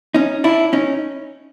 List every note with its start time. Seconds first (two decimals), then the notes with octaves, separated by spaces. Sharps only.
0.14 C#4 D#4
0.44 D4 E4
0.73 C#4 D#4